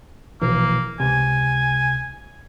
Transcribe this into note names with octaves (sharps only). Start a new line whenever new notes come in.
A#1 B2 E3 A#3
C#2 C3 G#5